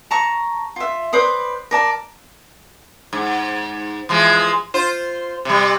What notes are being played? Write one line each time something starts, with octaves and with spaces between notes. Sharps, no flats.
A5 A#5 C#6
F4 E5
B4 C5 D5 D#6
A#4 D5 A5
G#2
E3 F3 G#3
F4 C5
C3 G3